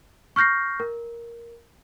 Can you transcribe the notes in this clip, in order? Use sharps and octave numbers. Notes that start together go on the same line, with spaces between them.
C#6 F6 G6 A#6 C7
A#4